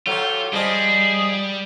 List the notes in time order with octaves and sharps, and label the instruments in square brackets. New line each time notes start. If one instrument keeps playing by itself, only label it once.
[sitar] F#3 C#5 [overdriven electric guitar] F4 [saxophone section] G4 A4
[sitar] F3 D#5 [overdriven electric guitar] G3 [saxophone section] G#4